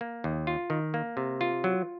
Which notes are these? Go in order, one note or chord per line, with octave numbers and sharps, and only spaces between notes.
A#3
D#2
F4
D#3
A#3
C3
F4
F#3